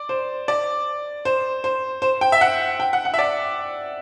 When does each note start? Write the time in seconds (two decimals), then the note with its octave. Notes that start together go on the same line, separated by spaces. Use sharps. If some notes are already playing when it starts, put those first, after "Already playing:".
Already playing: D5
0.09 C5
0.48 D5
1.25 C5
1.64 C5
2.02 C5
2.21 G5
2.32 E5
2.41 F#5
2.80 G5
2.93 F#5
3.05 F#5
3.14 E5
3.19 D5